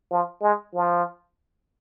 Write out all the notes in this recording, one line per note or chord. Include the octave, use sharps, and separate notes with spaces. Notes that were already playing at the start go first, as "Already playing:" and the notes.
F3
G#3
F3